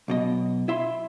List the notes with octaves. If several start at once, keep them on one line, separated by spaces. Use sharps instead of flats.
B1 B2 D#5
E4 E5 C6